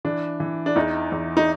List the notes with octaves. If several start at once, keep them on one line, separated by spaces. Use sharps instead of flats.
E3 D4
E3
D4
E2 D#4
E2
D#4